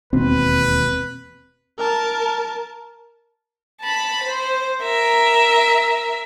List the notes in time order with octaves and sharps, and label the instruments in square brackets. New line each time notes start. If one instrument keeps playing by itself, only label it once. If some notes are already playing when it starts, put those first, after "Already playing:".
[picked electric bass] E1 D#2 B2 [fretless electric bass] C4 [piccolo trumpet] B4
[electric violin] A#4 A5
[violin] A5 B5
C5
A#4 E5